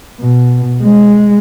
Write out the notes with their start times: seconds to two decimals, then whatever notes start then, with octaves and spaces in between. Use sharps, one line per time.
0.20 B2
0.83 G#3